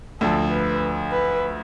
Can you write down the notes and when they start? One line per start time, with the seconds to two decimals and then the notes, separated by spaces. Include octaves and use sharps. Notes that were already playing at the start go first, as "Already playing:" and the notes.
0.20 D2 D3 F3 A4
0.51 B4
1.11 B4